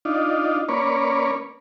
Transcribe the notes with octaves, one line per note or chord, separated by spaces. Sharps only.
D4 D#4 F4
A#3 C#4 B4 C#5 D5